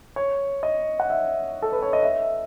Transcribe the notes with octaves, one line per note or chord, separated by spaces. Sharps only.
C#5
D#5
F#5
E5
A4
B4
C#5
D#5
E5